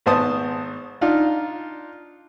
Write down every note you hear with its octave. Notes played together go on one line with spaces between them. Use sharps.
G#1 B3 C5 A5 D#6
D4 D#4 F4 F5